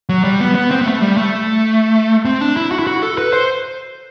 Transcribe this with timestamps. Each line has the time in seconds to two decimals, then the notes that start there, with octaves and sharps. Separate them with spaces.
0.09 F#3
0.24 G3
0.40 B3
0.55 B3
0.71 C4
0.81 B3
0.86 A3
1.02 G3
1.17 A3
2.25 C4
2.41 D4
2.57 E4
2.72 F#4
2.79 E4
2.87 F#4
3.03 A4
3.18 B4
3.33 C5